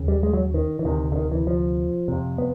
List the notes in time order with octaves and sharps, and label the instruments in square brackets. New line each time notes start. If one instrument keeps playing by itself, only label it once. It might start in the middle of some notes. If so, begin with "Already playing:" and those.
Already playing: [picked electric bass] D#2 C#3
G3
G#3
F#3
D#3
E3
D2 C3 D#3
D3
D#3
E3
F3
F2 C3
B3